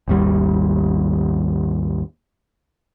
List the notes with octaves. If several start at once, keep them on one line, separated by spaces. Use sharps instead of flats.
G#1 D#2 G3